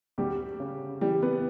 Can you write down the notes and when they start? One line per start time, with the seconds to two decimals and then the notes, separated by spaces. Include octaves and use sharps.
0.18 D2 G3 G4
0.60 C#3
1.01 E3 G3 G4
1.22 B3 B4